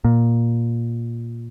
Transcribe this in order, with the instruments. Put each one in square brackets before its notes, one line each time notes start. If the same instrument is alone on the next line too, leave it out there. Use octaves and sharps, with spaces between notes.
[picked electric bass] A#2